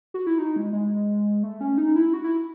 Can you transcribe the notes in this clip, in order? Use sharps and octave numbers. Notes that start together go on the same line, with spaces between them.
F#4
E4
D#4
G#3
G#3
A3
C#4
D#4
E4
F#4
E4